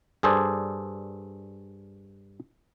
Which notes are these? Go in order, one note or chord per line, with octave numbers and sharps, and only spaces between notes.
G2 G#4 A4 C5 D5